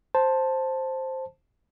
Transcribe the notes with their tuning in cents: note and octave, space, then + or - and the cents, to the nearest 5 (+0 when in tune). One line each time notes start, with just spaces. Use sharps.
C5 +5 A5 +0